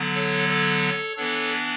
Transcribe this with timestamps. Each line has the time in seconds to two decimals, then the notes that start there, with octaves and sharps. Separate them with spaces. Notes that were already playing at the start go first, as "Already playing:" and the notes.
Already playing: D3 F#3 B3
0.15 A4 C#5
0.48 A4 C#5
1.17 E3 B3 D4 A4 C#5